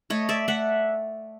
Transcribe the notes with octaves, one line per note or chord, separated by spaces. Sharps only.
A3 C#5 D#5
D5 E5
A3 E5 F#5